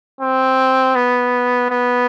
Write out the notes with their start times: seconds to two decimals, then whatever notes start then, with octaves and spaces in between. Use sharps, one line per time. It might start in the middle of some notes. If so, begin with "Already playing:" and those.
0.21 C4
0.95 B3
1.70 B3